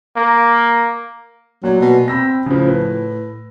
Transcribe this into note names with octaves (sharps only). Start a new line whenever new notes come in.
A#3
A#2 F#3
B2
C4 B5 E6 A#6
A2 C#3 F3
B4